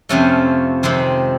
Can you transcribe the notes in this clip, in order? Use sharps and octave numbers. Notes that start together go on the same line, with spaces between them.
F2 C3 F3 A3 C#4
F2 C3 D#3 G#3 C4